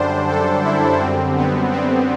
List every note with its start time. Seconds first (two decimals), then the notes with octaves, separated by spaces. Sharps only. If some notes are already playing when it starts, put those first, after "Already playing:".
Already playing: F#2 D3 G3 D4 C5
0.28 A4
0.64 E4
1.00 F#2 D3 G3 C4
1.37 B3
1.72 C4